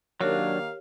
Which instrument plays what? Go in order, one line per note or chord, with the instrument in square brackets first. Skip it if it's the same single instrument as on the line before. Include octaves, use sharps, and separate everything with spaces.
[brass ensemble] D#3 A#3 [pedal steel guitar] F#3 D4 [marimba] G4 A#4 C#5 [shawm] F5